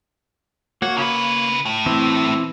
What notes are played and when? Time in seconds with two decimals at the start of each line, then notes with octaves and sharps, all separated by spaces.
0.82 A#3 F#4 C#5
0.97 C#3 B4
1.65 A2 A3
1.86 E3 C4 E4